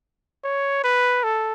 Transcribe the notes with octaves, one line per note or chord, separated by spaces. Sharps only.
C#5
B4
A4